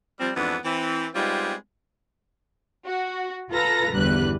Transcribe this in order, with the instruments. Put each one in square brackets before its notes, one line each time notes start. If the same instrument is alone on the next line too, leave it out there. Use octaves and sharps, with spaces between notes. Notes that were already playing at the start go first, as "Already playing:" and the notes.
[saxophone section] F3 G3 C4
F2 G#2 E3 B3 D4
E3 C4
G3 G#3 B3 C4 D#4 F4
[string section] F#4
F4 A4 B4 A#5 A#6
G1 E2 G3 B4 F#6